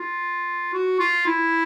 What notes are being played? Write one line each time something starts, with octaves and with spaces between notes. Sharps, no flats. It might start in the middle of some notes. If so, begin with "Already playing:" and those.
Already playing: F4
F#4
F4
E4